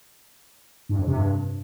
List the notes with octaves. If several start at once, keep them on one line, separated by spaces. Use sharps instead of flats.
G2
F2
C3
G2